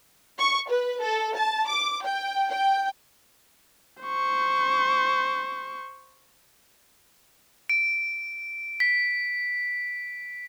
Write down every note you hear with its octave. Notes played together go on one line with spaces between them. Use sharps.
C#6
B4
A4
A5
D6
G5
G5
C5 C#6
D7
B6